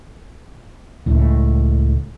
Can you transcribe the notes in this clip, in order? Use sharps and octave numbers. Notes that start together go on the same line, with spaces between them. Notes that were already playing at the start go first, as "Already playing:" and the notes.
C#2 A2